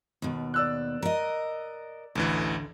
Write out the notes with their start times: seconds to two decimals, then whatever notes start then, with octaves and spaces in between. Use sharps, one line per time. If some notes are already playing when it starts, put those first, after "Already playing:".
0.22 D#2 B2
0.54 D5 E6 F#6
1.02 A#4 D#5
2.15 A1 D2 D3 E3